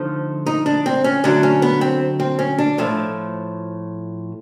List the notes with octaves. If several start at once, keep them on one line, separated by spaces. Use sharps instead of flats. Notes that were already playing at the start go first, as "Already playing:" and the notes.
Already playing: D3 F3 A3 D#4
D#4
D4
C4
C#4
D3 F#3 A3 D4
C#4
B3
C4
C4
C#4
D4
A2 F3 A3